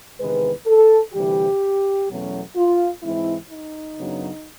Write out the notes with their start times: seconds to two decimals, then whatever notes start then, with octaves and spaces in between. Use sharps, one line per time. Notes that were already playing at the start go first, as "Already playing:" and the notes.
0.19 E2 C3 D#3 G#3 B4
0.66 A4
1.14 D2 C3 E3 G3 G4
2.09 E2 B2 F#3 A3 C#4
2.56 F4
3.03 G#2 E3 G#3 C4 E4
3.50 D#4
3.97 F#2 C#3 F#3 B3 D4